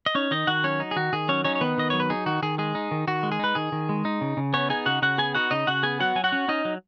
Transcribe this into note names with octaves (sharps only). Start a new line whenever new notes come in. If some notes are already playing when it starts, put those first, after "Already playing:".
D#5
C#4 D#4 C#5
D#3 D#4 D#5
D#3 F#4 F#5
F#3 C#4 C#5
D#4
G#4
D#3 F#4
D#3 G#4
F#3 C#4 C#5
C#4 D#4 C#5
C#5
D#3 B3 B4
D#3 D#5
F#3 C#5
B4
D#4 G#4
D#3 F#4
D#3 G#4
G#3 G#4
D#4
D#3
D#3 F#4
G#3
G#4
D#4 B4
D#3 G#4
D#3
G#3
D#4
C#3
C#3
B3 C#4 C#5
D#4 G#4 G#5
C#3 F#4 F#5
C#3 F#4 F#5
B3 G#4 G#5
D#4 F#4 F#5
C#3 D#4 D#5
C#3 F#4 F#5
B3 G#4 G#5
F#3 F#4 F#5
F#3 G#5
F#4 F#5
C#4
C#4 D#4 D#5
F#3